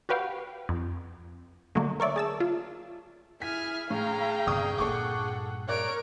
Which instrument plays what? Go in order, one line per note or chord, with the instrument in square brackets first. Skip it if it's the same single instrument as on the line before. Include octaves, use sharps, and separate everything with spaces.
[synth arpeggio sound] F#4 G4 B4 F5 G5
F2
D3 F#3 A3 A#3
A#4 C#5 D5 E5
G#4 A5 E6
F4
[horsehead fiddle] E4 G#4 [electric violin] G#5 F6 [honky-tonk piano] B6
[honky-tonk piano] A2 [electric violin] G#4 G5 [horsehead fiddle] F5 A#5
[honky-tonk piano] G1 C#6 D#6 [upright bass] G2 C3
[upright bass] G2 A#2 [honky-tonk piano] A4 C#6 D6 [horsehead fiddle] F#5
[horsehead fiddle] A#4 [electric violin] C#5 D7 [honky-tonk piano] D5 F#6